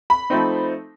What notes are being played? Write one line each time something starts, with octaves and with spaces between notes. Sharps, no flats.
B5
F3 A3 C4 D#4